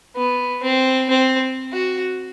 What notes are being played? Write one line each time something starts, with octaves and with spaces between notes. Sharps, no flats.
B3
C4
C4
F#4